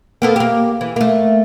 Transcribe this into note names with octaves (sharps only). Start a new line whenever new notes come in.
A#3 B3 A4
A#3 G4
E3
A3 A#3